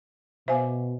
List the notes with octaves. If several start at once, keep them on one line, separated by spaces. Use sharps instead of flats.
B2 C5 E5 F5 G#5 D6